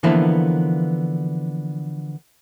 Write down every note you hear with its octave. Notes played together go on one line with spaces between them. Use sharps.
D3 E3 F3 A#3 B3 E4